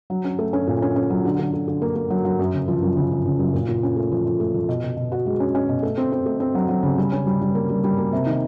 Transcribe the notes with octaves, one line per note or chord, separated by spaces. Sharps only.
F#3
C#4
A3
C#4
A#2
C#4
C#4
F#3
D3
D3
D3
D3
A#3
A#3
F#3
F#3
F#2
C#3
F3
F#2
C#3
F3
C#3
F#2
A#2
A#2
C#4
A3
F3
F3
A3
F3
B2
B2
B2
F#4
G#3
C#4
C#4
B2
A3
C4
C4
A3
C4
F#3
F#3
C#3
G3
C#4
G3
G3
A#3
G3
G3
A#3
C3
D#3